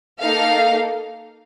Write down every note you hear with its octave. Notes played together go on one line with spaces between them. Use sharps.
A#3 D#4 A4 F5